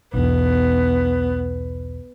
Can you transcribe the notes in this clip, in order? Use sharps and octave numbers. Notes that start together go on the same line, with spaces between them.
B1 E2 B3